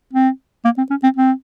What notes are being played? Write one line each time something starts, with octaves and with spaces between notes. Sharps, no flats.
C4
A#3
C4
C#4
C4
C4